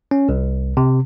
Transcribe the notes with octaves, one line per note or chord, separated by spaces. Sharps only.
C#4
C2
C3